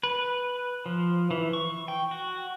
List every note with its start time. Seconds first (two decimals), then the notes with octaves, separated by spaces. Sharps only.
0.03 B4
0.86 F3
1.31 E3
1.53 C#6
1.88 G5
2.11 F#4